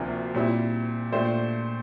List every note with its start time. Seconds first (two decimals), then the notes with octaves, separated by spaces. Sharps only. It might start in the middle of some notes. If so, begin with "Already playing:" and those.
Already playing: D2 C3 F3 A#3 D4
0.34 A#2 G3 C4 E4
1.12 A#2 A3 D4 G4 C5